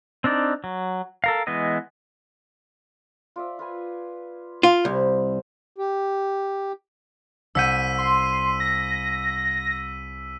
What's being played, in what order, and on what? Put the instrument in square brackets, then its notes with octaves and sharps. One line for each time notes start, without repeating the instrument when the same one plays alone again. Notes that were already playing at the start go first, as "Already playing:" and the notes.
[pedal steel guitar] C4 D4 D#4 D5
F#3
A4 A#4 F5
E3 G#3 B3 D#5
[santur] F4 D5 E5
F4 B4 G#5
[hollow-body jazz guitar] F4
[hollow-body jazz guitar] C2 [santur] A#4 C5 B5
[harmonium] G4
[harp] C2 F#5 G6 [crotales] E6 B6 D#7
[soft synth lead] C6
A#6